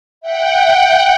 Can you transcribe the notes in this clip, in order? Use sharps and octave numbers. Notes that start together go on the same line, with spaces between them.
E5 F#5 G5